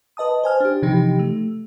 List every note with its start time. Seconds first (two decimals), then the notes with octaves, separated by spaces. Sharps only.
0.17 B4 D#5 A5 D#6
0.43 C5 G#5 F6
0.60 D4 G4
0.82 C3 E3 F3 D#4 G4
1.19 A3